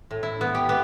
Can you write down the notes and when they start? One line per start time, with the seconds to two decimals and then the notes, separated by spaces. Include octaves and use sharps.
0.11 A2
0.23 E4
0.41 B3
0.55 G4
0.69 B3